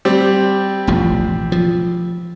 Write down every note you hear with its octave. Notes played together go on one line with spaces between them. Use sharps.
G3 C4 G4
E1 A1 F3
F3